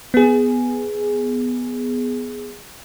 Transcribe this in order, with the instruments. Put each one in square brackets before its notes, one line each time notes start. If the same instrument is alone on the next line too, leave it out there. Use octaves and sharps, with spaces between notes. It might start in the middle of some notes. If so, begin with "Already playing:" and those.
[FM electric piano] B3 G#4